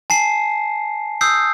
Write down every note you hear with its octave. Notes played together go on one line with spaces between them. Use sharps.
G#5 A5 C7
D#6 E6 G6 C7